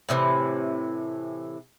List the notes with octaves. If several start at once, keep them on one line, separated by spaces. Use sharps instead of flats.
A2 C3 D#3 E3